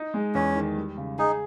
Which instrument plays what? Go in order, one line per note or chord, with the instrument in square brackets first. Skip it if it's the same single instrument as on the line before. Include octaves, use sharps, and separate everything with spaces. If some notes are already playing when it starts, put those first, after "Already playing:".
Already playing: [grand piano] D#4
G#3
[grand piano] E2 [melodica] C#4
[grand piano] D#3
G3
C#3
[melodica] D#4 [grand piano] G#4